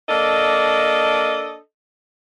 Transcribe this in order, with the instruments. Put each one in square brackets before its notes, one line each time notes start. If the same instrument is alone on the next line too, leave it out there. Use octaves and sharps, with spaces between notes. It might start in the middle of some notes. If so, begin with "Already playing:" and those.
[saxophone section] A#3 D4 A4 D#5